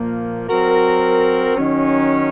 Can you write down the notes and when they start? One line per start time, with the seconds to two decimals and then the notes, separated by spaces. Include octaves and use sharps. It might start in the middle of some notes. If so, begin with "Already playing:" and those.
Already playing: A#2 F3 A#3
0.47 F#3 C4 F#4 A#4
1.55 D#3 F#3 C#4